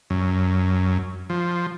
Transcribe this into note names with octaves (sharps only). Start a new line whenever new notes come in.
F#2
F3